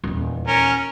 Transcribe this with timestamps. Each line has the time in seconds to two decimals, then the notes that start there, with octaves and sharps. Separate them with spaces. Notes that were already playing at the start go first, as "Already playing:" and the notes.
0.04 D#1 E2
0.48 C#4 A#4